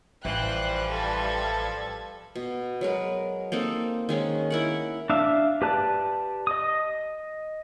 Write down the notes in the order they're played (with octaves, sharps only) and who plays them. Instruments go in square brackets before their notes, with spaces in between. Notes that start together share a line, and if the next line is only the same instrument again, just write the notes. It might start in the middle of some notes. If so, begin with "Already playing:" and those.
[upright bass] A1 [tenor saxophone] E3 [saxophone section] F3 G3 [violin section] C5 G5 F#6
[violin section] A4 B4 G#6
[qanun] B2
F#3 G#3 A#4 B4
A#3 C4 D#4 A4
D#3 G#3 C#4
E4 A#4 F#5
[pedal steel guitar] D4 E5 F5
G4 B4 D5 A5 F#6
D#5 D#6